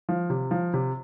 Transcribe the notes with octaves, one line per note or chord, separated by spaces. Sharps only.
F3
C3
F3
C3